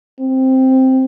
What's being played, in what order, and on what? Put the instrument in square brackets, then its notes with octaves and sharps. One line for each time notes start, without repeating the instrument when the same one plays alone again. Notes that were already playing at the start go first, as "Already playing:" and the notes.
[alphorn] C4